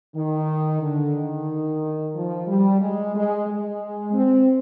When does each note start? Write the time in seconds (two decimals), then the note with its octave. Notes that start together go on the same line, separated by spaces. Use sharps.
0.15 D#3
0.82 D3
1.15 D#3
2.14 F3
2.48 G3
2.80 G#3
3.14 G#3
3.47 G#3
4.13 C4